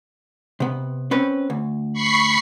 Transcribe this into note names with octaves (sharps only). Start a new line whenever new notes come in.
C3 B3
C4 C#4 B4
D2
B5 C#6 C7